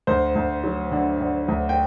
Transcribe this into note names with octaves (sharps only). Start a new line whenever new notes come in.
D2 C5
D2
F#3
D3
D3
D2
G5